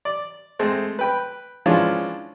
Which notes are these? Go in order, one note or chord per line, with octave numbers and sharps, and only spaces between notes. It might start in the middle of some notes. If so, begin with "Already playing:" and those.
D5
G#3 A3 C4
B4 G5 B5
E3 F3 G#3 C#4 D4 F4